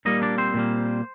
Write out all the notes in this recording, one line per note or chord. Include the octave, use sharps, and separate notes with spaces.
A#2 G3 A#3 D#4 D#5
D4 D5
C4 C5
A#2 G3 A#3